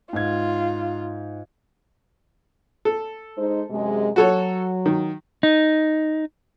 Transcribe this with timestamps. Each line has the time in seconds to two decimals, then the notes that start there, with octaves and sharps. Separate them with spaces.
0.13 G#2 F4 G#6
2.85 A4
3.37 G#3 D#4 C5
3.70 F#2 C3 G#3
4.16 F#3 F#4 A4 C#5
4.86 D#3
5.43 D#4